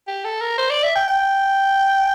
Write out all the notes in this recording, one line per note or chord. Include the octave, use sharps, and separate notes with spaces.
G4
A4
A#4
C5
D5
E5
G5
G5